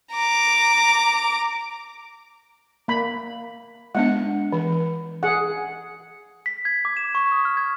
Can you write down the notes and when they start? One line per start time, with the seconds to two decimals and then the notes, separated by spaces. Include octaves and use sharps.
0.13 A#5 D6
2.88 A#3 B5
3.95 G#3 B3 D4 F#5
4.53 E3
5.23 G#4 F#5
6.46 B6
6.65 G#6
6.85 D6
6.97 E7
7.15 C#6
7.32 D#6
7.45 F6
7.57 G#6